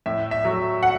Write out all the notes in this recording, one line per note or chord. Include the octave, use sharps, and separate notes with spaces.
A2 E5
E5
F#3 A3
F#5